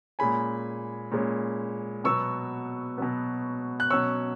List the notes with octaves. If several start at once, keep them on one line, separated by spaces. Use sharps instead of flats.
A#2 G#3 C#4 G#5 B5
A#2 G#3 C#4
B2 F#3 B3 C#6 E6
B2 F#3 B3
F#6
B2 F#3 C#4 C#6 E6